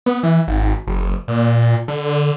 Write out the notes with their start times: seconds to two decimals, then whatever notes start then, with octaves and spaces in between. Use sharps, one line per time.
0.06 B3
0.23 E3
0.48 G#1
0.87 F#1
1.28 A#2
1.88 D3